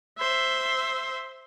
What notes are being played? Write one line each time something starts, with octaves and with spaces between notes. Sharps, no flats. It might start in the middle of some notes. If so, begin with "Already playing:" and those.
C5 E5